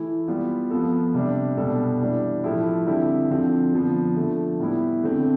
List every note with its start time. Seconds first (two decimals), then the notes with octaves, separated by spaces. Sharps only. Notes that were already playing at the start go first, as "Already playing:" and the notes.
Already playing: E3 A3 E4
0.28 G3 B3 F4
0.71 F3 B3 F4 A4
1.14 C3 G3 D4
1.57 B2 G3 B3 D4 A4
2.00 E3 G3 D4
2.44 A2 F3 A3 E4 G4
2.87 D3 G3 C4 E4
3.30 D3 F3 C4 F4
3.73 D3 F3 B3
4.16 D3 F3 A3
4.59 A2 G3 B3 E4
5.03 D3 A3 C4